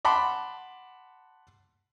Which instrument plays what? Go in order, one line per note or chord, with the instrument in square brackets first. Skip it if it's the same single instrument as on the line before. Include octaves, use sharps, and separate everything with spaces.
[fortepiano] F#5 A5 B5 C6 D6